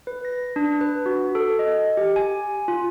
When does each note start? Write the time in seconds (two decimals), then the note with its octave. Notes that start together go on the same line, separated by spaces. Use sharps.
0.07 B4
0.25 A#6
0.56 D4
0.81 B4
1.06 F#4
1.35 A4
1.59 D#5
1.97 G4
2.16 G#5
2.68 F4